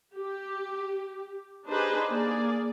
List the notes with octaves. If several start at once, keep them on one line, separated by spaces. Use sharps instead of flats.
G4
D4 D#4 G4 G#4 B4 C5
A#3 G#4 D5